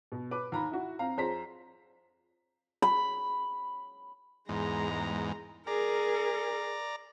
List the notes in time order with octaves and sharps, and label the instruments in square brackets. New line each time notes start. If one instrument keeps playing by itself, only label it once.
[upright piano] B2
B4 D6
D#2 A#5 B5
E4 F#4
C4 F5 A#5
F2 G#4 C5 A#5 B6
[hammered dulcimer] B5
[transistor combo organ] E2 G#2 [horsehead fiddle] G#3 A#5
[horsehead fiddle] G#4 A#4 [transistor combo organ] D5 A#5